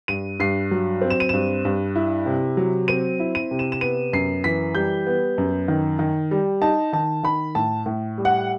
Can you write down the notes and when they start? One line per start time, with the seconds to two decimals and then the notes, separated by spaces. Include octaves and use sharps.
0.08 G2 D#7
0.39 G2 C7
0.71 F#3
1.01 C4
1.10 E7
1.20 D#7
1.29 G2 E7
1.65 G2
1.96 E4
2.26 C3
2.57 F#3
2.88 C4 D#7
3.20 E4
3.35 D#7
3.51 C3
3.59 E7
3.72 E7
3.81 B3 D#7
4.13 F#2 C7
4.44 E3 B6
4.75 G3 G6
5.06 B3
5.38 F#2
5.68 D#3
5.99 D#3
6.31 G3
6.62 D#4 A5
6.93 D#3 A5
7.23 D#3 B5
7.55 A2 A5
7.86 A2
8.18 G3
8.25 F#5